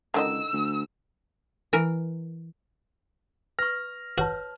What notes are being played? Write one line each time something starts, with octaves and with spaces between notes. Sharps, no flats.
C#2 D3 D#3 D#5 E6
D2
E3 A#4
B4 C#6 F6 A#6
F#4 B4 C#5 A5